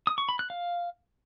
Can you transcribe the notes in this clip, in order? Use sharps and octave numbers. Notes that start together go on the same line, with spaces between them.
D#6
C#6
B5
F#6
F5